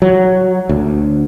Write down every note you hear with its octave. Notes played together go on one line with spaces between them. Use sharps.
F#3
D2